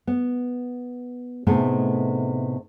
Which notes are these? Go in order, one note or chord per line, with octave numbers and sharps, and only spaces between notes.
B3
A2 C3 A3 B3 D#4 G#4